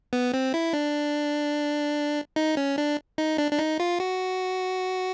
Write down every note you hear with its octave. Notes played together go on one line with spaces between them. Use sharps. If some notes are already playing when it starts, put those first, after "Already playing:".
B3
C4
E4
D4
D#4
C#4
D4
D#4
D4
D4
D#4
F4
F#4